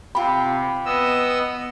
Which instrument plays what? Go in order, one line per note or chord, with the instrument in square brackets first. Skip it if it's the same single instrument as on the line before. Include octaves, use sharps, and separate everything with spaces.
[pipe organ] C3 [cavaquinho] F4 G4 [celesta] B5
[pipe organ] B3 D#5 E6